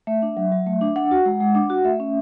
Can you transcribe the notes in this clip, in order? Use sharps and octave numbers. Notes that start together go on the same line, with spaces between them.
A3 E5
D4
F#3
F#3
A3
D4
D4 F#5
F#4
G#3
G#3
D4
F#4
A3 E5
C#4